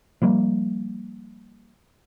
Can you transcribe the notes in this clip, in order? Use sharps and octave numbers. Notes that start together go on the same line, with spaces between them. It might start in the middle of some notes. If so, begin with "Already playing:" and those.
F3 G3 A#3